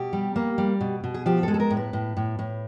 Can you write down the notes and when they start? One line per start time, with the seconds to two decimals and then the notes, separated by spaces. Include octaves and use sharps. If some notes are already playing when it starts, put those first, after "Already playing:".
Already playing: B2 G4
0.13 G3
0.36 A#3
0.58 G3
0.81 B2
1.04 B2
1.14 G#4
1.26 F3 G4
1.43 A4
1.48 G#3
1.54 A4
1.60 A#4
1.70 A2
1.77 B4
1.93 A2
2.17 A2
2.39 A2